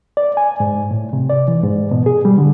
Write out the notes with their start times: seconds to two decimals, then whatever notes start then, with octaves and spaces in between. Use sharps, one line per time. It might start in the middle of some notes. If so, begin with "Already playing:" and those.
0.17 D5
0.37 G#5
0.60 G#2
0.91 A2
1.13 C3
1.30 D5
1.48 E3
1.63 G#2
1.91 B2
2.06 G#4
2.25 G3
2.38 D3